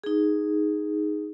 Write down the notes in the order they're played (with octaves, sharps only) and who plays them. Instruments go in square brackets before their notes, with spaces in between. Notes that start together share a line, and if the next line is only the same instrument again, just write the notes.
[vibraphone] D#4 G#4